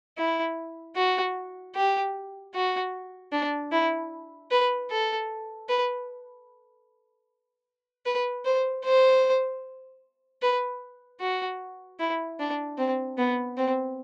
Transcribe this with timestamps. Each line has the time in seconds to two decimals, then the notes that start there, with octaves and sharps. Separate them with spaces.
0.18 E4
0.96 F#4
1.75 G4
2.55 F#4
3.32 D4
3.72 E4
4.51 B4
4.91 A4
5.69 B4
8.06 B4
8.45 C5
8.85 C5
10.42 B4
11.21 F#4
11.99 E4
12.40 D4
12.78 C4
13.18 B3
13.58 C4